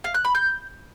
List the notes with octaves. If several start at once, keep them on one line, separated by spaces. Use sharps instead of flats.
F5
F#6
B5
G6